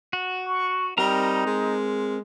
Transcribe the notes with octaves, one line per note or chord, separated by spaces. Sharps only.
F#4
C#6
G3 C4 D#4 A#4 A#5
G#3